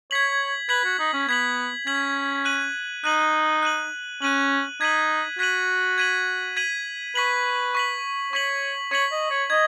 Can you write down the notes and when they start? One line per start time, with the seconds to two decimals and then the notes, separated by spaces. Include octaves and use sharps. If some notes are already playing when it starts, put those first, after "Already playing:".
0.11 C#5 G#6 B6 F#7
0.69 B4 G#6 B6 F#7
0.84 F#4
0.99 D#4
1.13 C#4
1.28 B3 G#6 B6 F#7
1.86 C#4 G#6 B6 F#7
2.45 F#6 D#7 F#7
3.04 D#4 F#6 D#7 F#7
3.62 F#6 D#7 F#7
4.21 C#4 F#6 D#7 F#7
4.81 D#4 G#6 B6 D#7 F#7
5.39 F#4 G#6 B6 D#7 F#7
5.98 G#6 B6 D#7 F#7
6.57 G#6 B6 D#7 F#7
7.15 B4 C#6 B6 F#7
7.75 C#6 B6 F#7
8.33 C#5 C#6 B6 F#7
8.91 C#5 C#6 B6 F#7
9.11 D#5
9.30 C#5
9.50 D#5 G#6